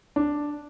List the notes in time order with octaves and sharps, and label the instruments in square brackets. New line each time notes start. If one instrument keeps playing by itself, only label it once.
[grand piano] D4